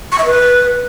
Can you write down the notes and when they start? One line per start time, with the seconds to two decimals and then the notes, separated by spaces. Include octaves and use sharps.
0.12 C#6
0.19 E5
0.25 B4